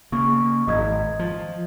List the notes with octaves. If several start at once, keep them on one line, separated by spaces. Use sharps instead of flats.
C#3 A#3 C#6
D#1 G#1 D#5 D#6 G#6
F3